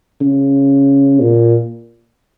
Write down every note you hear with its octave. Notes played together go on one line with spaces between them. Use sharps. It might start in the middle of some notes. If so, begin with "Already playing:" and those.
C#3
A#2